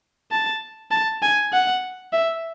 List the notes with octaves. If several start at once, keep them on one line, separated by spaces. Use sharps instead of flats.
A5
A5
G#5
F#5
E5